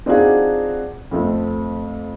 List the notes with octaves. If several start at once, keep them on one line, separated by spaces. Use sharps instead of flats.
C4 D4 D#4 F4 F#4 G#4
F2 A3 C4